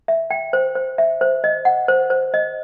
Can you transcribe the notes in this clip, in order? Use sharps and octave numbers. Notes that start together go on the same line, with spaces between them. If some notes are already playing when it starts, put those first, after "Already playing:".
E5
G5
C5
C5
E5
C5
D#5
F#5
C5
C5
D#5